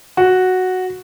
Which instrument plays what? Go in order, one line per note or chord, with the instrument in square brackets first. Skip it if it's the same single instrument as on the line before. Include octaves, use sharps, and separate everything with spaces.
[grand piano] F#4